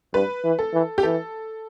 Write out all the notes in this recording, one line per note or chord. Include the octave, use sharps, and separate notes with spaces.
G2 B4
E3
A4
E3
G4
E3 A4